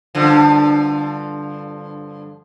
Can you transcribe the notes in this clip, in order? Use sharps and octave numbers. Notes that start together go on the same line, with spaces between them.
G2 D3 F3